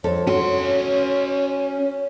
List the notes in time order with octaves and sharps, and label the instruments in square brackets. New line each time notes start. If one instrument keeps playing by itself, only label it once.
[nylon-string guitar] F2 A4 [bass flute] C#5
[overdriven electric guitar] C#4 C6 [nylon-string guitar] F#4